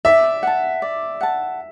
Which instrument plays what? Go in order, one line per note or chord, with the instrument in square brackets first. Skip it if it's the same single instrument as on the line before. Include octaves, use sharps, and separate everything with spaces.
[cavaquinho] D5 [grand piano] E5
[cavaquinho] F#5 A5
D5
F#5 A5